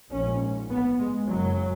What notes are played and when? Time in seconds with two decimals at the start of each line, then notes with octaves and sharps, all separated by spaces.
0.11 A#1 G#2 C#4
0.69 B3
0.99 G#3
1.27 F#1 F#2 C#3 F#3